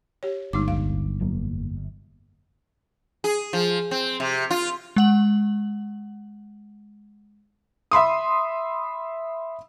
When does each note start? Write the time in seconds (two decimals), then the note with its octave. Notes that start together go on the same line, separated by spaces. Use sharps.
0.23 G4 C#5
0.53 G1 G#3 D#4 D6
0.68 D1 A#1 G3 F5
1.20 F1 F#3 A#3
3.24 G#4
3.53 F3
3.91 C4
4.20 C3
4.51 F4
4.96 G#3 F#5 F#7
7.91 E5 B5 C6 D#6